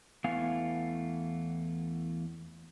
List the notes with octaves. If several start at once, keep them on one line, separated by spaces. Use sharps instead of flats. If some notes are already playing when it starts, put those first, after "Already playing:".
E2 E3 A3 B3 F5 G#5